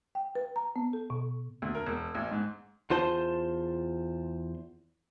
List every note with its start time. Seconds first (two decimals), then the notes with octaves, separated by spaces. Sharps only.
0.15 G5
0.35 B4
0.56 A#5
0.76 B3
0.93 A4
1.10 B2
1.62 D2
1.75 A#4
1.86 E1
2.15 A1
2.31 G#2
2.90 E2 F4 C5 A5 C6